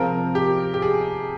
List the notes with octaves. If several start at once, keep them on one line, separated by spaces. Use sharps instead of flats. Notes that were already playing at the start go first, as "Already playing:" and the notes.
Already playing: C3 F3 G#3 C4 F4 A#4
G4
G4
G#4